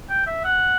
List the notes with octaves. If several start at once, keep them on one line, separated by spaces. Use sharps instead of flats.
G5
E5
F#5